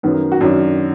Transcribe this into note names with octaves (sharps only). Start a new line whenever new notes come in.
F#2 D#3 F#3 B3
A#4
F#4
F#2 D#3 F#3 D4